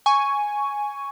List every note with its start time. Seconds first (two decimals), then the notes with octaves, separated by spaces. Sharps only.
0.06 G#5 C#6